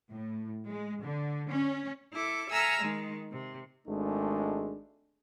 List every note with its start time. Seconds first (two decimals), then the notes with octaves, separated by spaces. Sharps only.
0.11 A2
0.67 G#3
1.04 D3
1.49 C#4
2.13 E4 A4 D6
2.49 A4 E5 G#5 A#5 E6 F6
2.81 D#3 G#3
3.30 C3
3.88 G#1 G#3 A3 D4